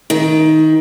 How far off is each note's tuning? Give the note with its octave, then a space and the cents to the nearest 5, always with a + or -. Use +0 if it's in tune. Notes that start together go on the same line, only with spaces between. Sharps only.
D#3 +15